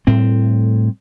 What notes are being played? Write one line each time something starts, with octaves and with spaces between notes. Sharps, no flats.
A2 G3 C4